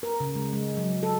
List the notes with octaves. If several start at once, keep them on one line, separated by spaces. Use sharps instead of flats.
A#4
C#3
G#3
G#3
F#3
A4